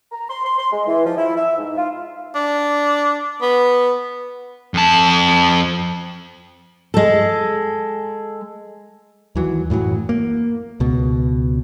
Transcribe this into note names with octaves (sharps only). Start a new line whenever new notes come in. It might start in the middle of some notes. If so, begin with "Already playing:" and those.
A#5
C6
C6
C6
G#3
E3
F3
E4
E5
G#2
F4
D4
B3
F2 A5
G#3 A4
D#2 E3 F#3
F#2 A2 E3 F#3
A#3
C#2 B2